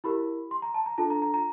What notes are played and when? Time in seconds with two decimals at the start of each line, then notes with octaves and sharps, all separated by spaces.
0.04 E4 G4 A#4 B5
0.51 C6
0.62 A#5
0.74 A5
0.86 A#5
0.98 D4 F4 A4 A5
1.10 A#5
1.22 A#5
1.34 A#5